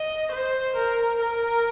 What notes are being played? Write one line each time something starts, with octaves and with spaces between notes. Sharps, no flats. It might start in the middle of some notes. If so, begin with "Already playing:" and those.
Already playing: D#5
C5
A#4
A#4